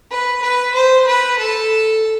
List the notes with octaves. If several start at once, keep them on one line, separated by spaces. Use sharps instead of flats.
B4
B4
C5
B4
A4